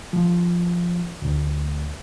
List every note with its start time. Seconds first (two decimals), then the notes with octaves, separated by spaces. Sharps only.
0.13 F3
1.22 D2